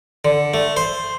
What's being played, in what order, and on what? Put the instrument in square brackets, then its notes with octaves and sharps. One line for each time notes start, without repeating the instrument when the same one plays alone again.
[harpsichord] D3
A3
C5